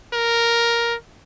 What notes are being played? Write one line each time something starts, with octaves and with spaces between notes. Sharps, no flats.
A#4